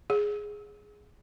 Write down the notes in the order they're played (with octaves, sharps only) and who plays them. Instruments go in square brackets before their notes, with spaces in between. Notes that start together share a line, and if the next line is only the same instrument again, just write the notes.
[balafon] G#4